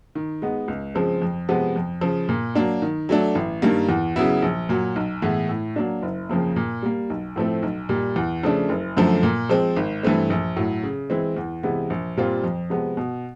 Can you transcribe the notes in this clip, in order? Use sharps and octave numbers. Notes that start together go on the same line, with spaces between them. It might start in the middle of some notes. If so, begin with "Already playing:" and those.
D#3
G#3 B3 D#4
C#2
C#3 F3 G#3 C4
F2
C3 F3 G#3 B3
F2
C#3 F3
A#2
F#3 A#3 D4
D#3
F#3 A3 D4
A1
G2 D#3 G3 A#3
E2
C#3 F#3 B3 E4
A#1
A#2 F#3
B1
A2 E3 G#3 B3
A2
F#3 A#3 D4
F#1
F2 C#3 F3 A#3
A#2
G3 A#3
B1
A2 F3 A3 C4
B1
A#2 G3
E2
C#3 F3 A3 D4
F#1
F#2 D3 F3 A3
A#2
F3 G#3 C4
G#1
G2 E3 A3 C4
A#1
A2 F#3
C#3
E3 G#3 C4
E2
C3 E3 G#3 B3
A#1
A#2 G3 C4 F4
F2
C3 F3 G#3 B3
B2